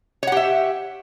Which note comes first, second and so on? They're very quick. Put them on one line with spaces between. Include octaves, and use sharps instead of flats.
C#5 F#5 G4 E5